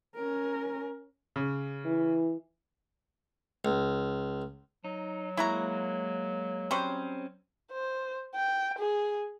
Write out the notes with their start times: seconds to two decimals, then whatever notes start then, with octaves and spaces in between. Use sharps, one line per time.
0.16 C#4 A#4
1.36 C#3
1.85 E3
3.65 C#2
4.84 F#3 D#4
5.37 G#3 A#3 E4 F#4 A#5
6.71 G3 C4 C#4 F#4 C5
7.71 C5
8.35 G5
8.78 G#4